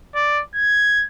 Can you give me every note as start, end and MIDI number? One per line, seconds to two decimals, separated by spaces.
0.15 0.41 74
0.55 1.05 92